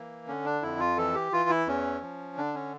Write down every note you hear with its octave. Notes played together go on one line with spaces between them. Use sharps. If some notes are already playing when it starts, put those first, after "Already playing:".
Already playing: E3 A#3
D3 C#4
D4
F2 E4
F4
E3 A4
G4
E3 F4
E4
E2 C#4
F3
D3 D4
C#4